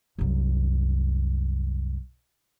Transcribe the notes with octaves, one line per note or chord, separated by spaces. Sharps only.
C2 F#2